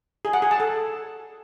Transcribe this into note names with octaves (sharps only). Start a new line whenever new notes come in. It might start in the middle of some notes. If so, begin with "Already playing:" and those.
G#4
F#5
G#4
A5
A4